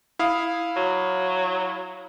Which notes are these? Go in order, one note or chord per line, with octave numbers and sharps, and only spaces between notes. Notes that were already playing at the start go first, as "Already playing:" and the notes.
E4 F5 D#6
F#3